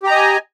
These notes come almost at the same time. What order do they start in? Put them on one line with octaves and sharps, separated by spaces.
G4 A#5 D#5 G#5